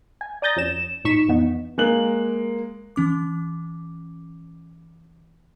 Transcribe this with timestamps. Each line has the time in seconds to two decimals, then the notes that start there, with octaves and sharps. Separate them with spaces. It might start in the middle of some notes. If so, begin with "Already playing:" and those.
0.21 G#5
0.42 D5 A#5 D#6 G6 A6 A#6
0.56 F2 C#4 E7
1.04 A1 A#2 D#4 C#6 B6 E7
1.28 F2 E3 B3 D#4
1.78 G#3 A#3 F#6 F#7
2.96 E3 C#4 D6